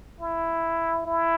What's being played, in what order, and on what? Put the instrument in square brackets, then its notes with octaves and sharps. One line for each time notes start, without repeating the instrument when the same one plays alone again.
[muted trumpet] E4
E4